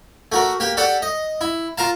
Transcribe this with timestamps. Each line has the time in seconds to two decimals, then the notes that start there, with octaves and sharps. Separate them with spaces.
0.32 A3 F#4 A#4
0.60 A#3 G4
0.77 G4 A4 D5 F#5
1.02 D#5
1.41 E4
1.78 F4 A#4 F5 A5